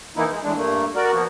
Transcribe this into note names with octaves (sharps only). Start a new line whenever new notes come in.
E3 A#3 B3 D#4 E4
G#3
A2 E3 G#3 D4
G2 A3 A#3
F#4 A#4 D5
F3 A#3 B3